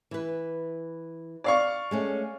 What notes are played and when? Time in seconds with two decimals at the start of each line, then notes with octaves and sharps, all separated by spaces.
0.11 E3 B4
1.44 D5 F5 C#6
1.91 G#3 A3 C#4